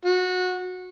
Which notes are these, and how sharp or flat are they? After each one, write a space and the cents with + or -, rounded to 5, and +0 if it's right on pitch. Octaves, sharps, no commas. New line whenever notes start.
F#4 -20